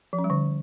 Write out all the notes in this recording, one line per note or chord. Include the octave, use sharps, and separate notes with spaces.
F3
C#4
G3
D3